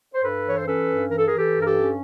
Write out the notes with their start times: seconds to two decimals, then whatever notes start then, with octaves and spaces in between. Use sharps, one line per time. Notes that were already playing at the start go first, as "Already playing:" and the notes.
0.14 C5
0.24 G2 A4 B4
0.46 E3 C#5
0.58 C5
0.67 C#4 A4 B4
0.88 G2
1.09 E3 A#4
1.18 A4
1.27 E3 G#4 A#4
1.38 G4 A4
1.52 G2
1.61 A#4
1.65 G4 A4
1.73 C#4